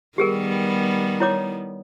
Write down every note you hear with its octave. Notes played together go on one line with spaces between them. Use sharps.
D#3 G3 B3 G4 G#4 A#4
E4 C#5 D6